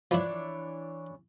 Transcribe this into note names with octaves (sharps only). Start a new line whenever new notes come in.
E3 F3 D4 E4 C#5